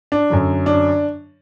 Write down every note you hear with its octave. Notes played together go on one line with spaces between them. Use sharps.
D4
F#2 D3 F#3
D4